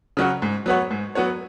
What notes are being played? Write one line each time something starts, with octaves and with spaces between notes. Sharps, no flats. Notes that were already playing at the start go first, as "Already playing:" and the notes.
C#3 F#3 C#4 F#4
G#2
F#3 B3 F#4 C#5
G#2
F#3 B3 F#4 C#5